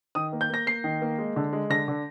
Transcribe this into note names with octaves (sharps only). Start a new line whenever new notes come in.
D#3 D#6
A#3
G6
A#3 A#6
A#3 C7
D#3
A#3
G#3
D3
G#3
D3 A#6
D3